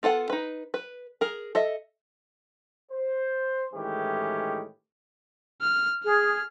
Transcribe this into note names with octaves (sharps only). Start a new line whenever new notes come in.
B3 F4 A4 F#5
D#4 B4
B4
G#4 A#4
A4 D#5 E5
C5
A2 D#3 E3 G#3 C#4 G4
F6
G#4 F6